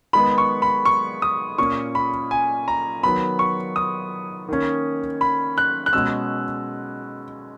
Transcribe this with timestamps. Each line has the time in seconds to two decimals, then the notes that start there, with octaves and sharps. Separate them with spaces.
0.13 D#3 G#3 B3 B5
0.38 C#6
0.62 B5
0.85 C#6
1.22 D#6
1.58 A#2 A#3 C#4 C#6
1.95 B5
2.31 G#5
2.68 A#5
3.03 D#3 F#3 B3 B5
3.39 C#6
3.76 D#6
4.48 D#3 A#3 C#4
5.21 B5
5.58 F#6
5.86 F#6
5.93 B2 G#3 C#4 E6